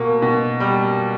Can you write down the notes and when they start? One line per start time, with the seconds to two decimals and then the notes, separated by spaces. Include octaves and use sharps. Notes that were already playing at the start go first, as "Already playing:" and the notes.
Already playing: B2 A#3
0.22 B2
0.60 G3